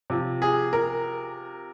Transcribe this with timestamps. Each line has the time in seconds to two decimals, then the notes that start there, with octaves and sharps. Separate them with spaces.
0.10 C3 F3
0.42 G#4
0.73 A#4